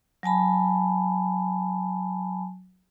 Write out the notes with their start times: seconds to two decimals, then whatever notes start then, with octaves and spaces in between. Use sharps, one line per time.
0.23 F#3 G#5 A5 B5